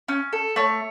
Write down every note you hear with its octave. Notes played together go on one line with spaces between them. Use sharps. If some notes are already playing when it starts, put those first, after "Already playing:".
C#4
A4
A3 C#5